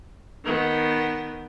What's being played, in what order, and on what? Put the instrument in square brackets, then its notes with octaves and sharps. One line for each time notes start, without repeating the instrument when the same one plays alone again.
[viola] D#3 B3